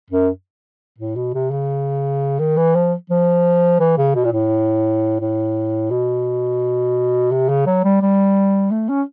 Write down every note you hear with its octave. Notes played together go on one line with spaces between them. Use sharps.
F#2
A2
B2
C3
C#3
D#3
E3
F3
F3
E3
C#3
B2
A#2
A2
A2
B2
C3
C#3
F#3
G3
G3
A3
C#4